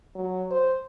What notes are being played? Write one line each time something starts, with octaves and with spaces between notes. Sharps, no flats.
F#3
C5